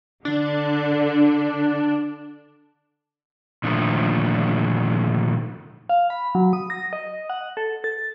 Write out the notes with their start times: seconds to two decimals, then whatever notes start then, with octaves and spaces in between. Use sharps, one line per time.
0.25 D3 D4
3.64 A#2 D3 D#3 F3 A3
5.89 F5
6.10 B5
6.35 F#3
6.53 D#6
6.70 A#6
6.93 D#5
7.30 F#5
7.57 A4
7.84 A6